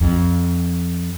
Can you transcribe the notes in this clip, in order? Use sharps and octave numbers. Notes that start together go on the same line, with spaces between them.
F2